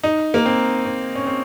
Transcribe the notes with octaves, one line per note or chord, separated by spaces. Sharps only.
D#4
A#3
C4
C4
C#4
C4